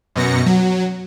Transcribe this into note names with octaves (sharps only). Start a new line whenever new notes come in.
F#2 B2 A#6 C#7
F#3